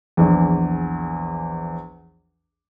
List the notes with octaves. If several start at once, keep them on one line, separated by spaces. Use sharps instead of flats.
A#1 E2